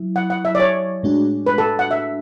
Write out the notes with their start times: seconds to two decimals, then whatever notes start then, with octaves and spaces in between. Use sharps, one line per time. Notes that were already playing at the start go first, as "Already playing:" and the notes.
Already playing: F#3 E4
0.16 F#5
0.30 F#5
0.45 E5
0.55 D5
0.60 C#5
1.03 A2 G#3 D4 F#4
1.46 B4
1.58 A4
1.79 F#5
1.91 E5